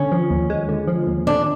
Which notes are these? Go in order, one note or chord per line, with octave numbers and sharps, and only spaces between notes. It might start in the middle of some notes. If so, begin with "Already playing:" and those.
Already playing: D3 C#4
F3
D#2
G#3
D3
F3
D#2
D3 D4